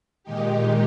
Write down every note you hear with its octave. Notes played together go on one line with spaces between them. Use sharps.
A#2 D#3 G#3 D#4 G4